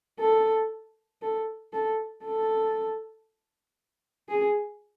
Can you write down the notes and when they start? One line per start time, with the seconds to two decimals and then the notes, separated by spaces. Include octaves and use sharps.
0.20 A4
1.22 A4
1.73 A4
2.24 A4
4.29 G#4